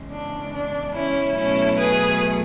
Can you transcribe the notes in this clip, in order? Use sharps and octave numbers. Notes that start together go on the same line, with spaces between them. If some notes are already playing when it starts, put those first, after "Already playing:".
Already playing: E2 C#3 G#3
D4
D4
C#4 E4
B2 F#3 A3 C#4 E4
G#4 B4